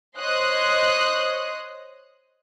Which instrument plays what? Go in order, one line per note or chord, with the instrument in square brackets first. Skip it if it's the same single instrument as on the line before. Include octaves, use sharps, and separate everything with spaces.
[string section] C5 C#5 D#5 C6 D#6 F#6